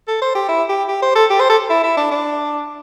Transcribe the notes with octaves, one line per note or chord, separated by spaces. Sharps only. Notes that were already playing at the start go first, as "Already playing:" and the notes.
A4
C5
G4
E4
G4
G4
C5
A4
G4
C5
A4
E4
E4
D4
D4